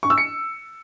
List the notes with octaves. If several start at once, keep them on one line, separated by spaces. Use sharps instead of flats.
C#6
E6
C#7